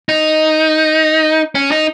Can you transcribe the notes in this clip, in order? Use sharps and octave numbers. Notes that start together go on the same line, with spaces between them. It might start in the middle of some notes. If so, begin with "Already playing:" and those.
D#4
C#4
D#4